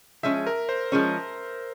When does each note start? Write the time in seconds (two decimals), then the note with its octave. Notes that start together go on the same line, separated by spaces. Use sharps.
0.23 F3 G#3 C#4 E5
0.47 A#4
0.69 C5
0.92 F3 G#3 C#4